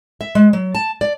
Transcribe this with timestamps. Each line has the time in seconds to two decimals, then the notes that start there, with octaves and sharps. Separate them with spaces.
0.21 E5
0.35 G#3
0.53 F#3
0.75 A5
1.01 D5